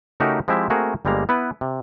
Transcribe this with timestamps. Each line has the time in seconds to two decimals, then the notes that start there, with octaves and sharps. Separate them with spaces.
0.20 C#3 A3 D#4 F#4 G4 A#4
0.48 F3 G#3 C4 E4 G4 E5
0.70 A3 A#3 C4 F#4 G#4 A#4
1.05 G1 G3 G#3 A#3 A#5
1.29 B3 E4 B4
1.61 C3